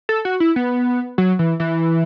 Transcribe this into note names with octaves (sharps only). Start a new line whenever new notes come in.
A4
F#4
E4
B3
F#3
E3
E3